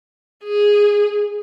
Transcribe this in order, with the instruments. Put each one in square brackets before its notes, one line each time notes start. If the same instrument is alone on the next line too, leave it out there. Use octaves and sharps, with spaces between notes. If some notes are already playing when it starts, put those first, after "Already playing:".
[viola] G#4